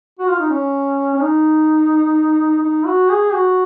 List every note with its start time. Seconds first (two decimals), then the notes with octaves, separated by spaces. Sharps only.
0.19 F#4
0.29 F4
0.40 D#4
0.50 C#4
1.14 C#4
1.21 D#4
2.62 D#4
2.86 F#4
3.10 G#4
3.33 F#4